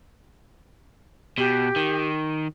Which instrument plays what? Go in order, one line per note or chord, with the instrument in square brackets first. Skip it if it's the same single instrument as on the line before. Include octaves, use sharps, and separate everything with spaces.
[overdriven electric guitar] B2 [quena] G4
[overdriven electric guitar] D#3